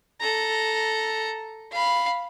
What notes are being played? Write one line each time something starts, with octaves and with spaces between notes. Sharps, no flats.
A4 A#5
F5 B5